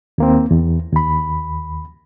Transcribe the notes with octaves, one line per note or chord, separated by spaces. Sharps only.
D#2 A#3 C4
E2
D#2 B5